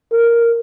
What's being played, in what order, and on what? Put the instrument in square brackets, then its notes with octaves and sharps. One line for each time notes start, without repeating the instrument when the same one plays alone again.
[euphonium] A#4